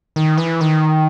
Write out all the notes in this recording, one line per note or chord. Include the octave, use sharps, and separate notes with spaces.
D#3
E3
D#3